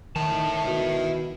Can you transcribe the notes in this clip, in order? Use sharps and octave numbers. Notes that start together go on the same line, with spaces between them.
D#3 E4 A5
B2